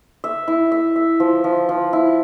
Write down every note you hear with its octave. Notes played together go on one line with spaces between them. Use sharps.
E5
E4
E5
E5
F3
F3
F3
E4